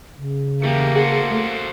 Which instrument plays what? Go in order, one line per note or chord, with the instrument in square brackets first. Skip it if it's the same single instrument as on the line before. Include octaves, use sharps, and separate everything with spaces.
[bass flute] C#3
[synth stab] E2 [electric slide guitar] A3 G4 [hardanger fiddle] A#3
[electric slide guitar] F#4 A4 C5 [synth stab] G#4
[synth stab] A3